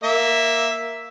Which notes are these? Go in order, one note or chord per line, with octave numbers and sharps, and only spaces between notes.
A#3 E5